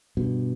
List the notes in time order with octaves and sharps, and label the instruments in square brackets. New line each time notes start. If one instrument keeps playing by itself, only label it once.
[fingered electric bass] G2 B2